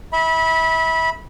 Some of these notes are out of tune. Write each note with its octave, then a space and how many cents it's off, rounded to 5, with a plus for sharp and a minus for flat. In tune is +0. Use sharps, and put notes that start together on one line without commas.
E5 -30 B5 -20